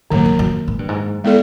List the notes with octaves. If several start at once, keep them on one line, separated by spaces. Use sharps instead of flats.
G#2 D#3 F#3 A#3
G2
F#2
G#2
G2
G#2
G#3 B3 E4 A4 D5